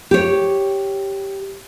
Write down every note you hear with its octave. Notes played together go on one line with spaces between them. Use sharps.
G4 C#5